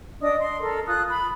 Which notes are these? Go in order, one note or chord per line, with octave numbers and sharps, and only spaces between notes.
D4 D#5 D#6
C6
A4 A#4
F4 D#6 F#6
B5